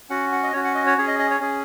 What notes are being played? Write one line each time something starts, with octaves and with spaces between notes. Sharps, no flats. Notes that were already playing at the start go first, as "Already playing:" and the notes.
C#4 F#4 F#5
F#5
D#5
C#4 F#4 C#5
F#5
D#5
C#5
C#4 G#4 C#5
D#5
D#5
C#5
C#4 G#4